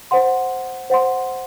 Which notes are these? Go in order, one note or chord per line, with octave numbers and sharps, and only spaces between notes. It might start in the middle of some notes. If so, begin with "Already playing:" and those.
C5 F#5 C6
C5 F#5 C6